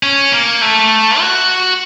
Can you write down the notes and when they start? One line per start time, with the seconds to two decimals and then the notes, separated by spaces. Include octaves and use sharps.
0.03 C#4
0.32 A#3
0.61 A3
1.20 F#4